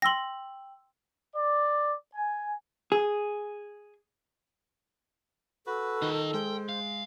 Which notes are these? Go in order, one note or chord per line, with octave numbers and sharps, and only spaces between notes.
G5 C6 E6 A#6 F#7
D5
G#5
G#4
F#4 A4 B4
D#3 F4 D#5
G#3 C5 G5
F5